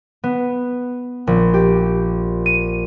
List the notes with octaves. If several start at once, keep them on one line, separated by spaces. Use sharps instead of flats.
B3
A#1
G4
D#7